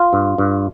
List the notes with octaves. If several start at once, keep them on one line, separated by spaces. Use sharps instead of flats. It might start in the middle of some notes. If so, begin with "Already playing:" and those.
Already playing: F4
G2
G2